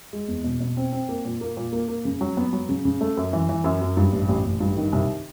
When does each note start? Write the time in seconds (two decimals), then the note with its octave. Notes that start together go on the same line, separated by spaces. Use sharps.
0.13 G#3
0.28 E2
0.44 B2
0.60 B2
0.77 C4
0.92 C4
1.09 A#3
1.25 A#2
1.41 A#3
1.57 A#2
1.73 A#3
1.88 A#3
2.05 C#3
2.21 F#3
2.37 B3
2.53 F#3
2.69 C#3
2.85 C#3
3.01 A3
3.17 F#2
3.33 E3
3.49 E3
3.64 F#2
3.81 F#2
3.97 G2
4.12 A1
4.29 A1
4.45 A1
4.60 G2
4.76 D#3
4.93 C2